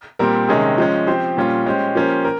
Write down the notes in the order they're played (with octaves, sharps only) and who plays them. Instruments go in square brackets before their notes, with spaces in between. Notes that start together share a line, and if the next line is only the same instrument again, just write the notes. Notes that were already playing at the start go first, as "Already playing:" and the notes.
[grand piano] A#2 G3 C4 G4 A#4
C3 D#3 G#3 C#4 G#4
F3 G#3 C#4
F3 C4 G4 C5
A#2 G3 C#4 F4
G#3 C#4 G4 C5
F3 A#3 C#4 G4 C5
A#4